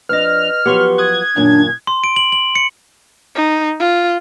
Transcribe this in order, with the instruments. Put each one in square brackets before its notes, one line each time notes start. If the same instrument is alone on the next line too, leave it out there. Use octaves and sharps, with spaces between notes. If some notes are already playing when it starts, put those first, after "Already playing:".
[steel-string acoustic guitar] F2 D4 [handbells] B4 D#5 [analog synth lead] F6
[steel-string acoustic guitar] F3 F#3 B3 [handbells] G4 C6 C#6
[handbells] D#6 F#6 [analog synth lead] G#6
[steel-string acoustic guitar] F#2 A#2 D#3 [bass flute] D4
[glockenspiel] C6
D7
F#7
F#7
C#7
[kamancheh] D#4
F4